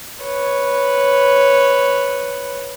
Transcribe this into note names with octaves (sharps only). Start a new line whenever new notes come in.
B4 C#5